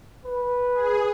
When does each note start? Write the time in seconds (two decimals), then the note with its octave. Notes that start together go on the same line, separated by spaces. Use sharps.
0.26 B4
0.74 G#4